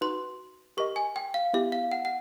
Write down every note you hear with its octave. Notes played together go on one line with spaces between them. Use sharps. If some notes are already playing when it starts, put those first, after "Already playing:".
D#4 F#4 B4 C6
G4 A#4 D#5 C#6
G#5
G5
F5
B3 E4 G4 E5
F5
F#5
F#5